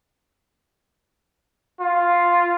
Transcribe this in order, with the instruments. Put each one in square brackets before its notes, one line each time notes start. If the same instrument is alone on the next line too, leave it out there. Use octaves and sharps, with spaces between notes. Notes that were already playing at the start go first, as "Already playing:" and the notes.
[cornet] F4